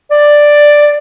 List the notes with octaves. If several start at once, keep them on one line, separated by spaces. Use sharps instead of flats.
D5